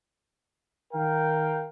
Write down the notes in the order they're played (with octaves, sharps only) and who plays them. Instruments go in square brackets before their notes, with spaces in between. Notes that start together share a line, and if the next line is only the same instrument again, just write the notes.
[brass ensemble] D#3 A#4 F5 G5